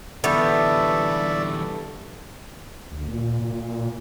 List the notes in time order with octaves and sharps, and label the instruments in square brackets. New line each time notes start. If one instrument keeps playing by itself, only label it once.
[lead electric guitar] D3 E3 [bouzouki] G3 A3 B3 [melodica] D5 E5
[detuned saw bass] D2
A#2
A#2